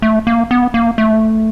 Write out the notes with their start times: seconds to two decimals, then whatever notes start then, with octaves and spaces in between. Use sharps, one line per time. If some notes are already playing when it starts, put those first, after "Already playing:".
0.02 A3
0.27 A#3
0.51 B3
0.74 A#3
0.98 A3